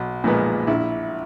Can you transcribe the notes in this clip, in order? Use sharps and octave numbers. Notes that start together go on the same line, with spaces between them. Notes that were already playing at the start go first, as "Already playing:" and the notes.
Already playing: B1
A#2 F3 G#3 B3
A#1 E4